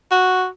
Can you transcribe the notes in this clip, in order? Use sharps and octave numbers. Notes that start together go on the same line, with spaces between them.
F#4